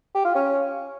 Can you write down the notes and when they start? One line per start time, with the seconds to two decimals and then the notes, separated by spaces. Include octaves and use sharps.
0.15 G4
0.25 F4
0.35 C#4